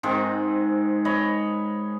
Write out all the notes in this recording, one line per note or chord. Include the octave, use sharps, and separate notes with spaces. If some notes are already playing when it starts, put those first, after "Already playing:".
G#2 D#3 G#3 C4
C#5 D#5 B5